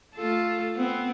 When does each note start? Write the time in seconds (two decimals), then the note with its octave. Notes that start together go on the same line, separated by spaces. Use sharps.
0.16 A3 F4 A4
0.76 B3 C4